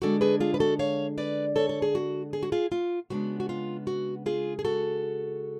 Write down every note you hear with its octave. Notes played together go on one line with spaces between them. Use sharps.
D3 G#3 D4 F#4 A4
G#4 B4
F4 G#4
B4
F#4 A4
C#5 F5
B4 D5
A4 C#5
A4
G#4
F#4
G#4
F#4
F4 G#4
F4
C#3 G#3 B3 D4 F#4
F#4
F4
F#4
F4 G#4
G#4
F#4 A4